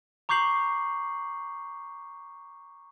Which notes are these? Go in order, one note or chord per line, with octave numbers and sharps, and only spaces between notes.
A#5 C#6 D6 G6 C7 F#7